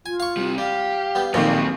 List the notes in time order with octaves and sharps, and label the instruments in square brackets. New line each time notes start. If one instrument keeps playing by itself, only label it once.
[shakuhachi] F4 [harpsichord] G#5
[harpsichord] F5 C#6
[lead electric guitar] C3 G3
[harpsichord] G3 [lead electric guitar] G4 [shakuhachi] F5
[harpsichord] G3 B3
[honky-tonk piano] A#1 D#3 [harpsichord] F2 A#2 G3 [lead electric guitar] F#3 C4